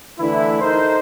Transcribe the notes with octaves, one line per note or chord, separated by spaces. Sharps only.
D3 E3 A3 E4
D#4 A4 A#4 C5